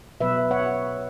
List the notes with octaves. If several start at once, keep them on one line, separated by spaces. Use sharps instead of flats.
B2 F#3 B3 B4 E5
C#5 F#5